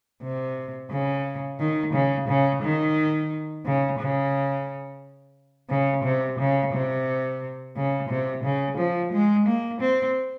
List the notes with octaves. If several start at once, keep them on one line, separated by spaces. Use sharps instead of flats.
C3
C#3
D#3
C#3
C#3
D#3
C#3
C#3
C#3
C3
C#3
C3
C#3
C3
C#3
F3
G#3
A#3
C4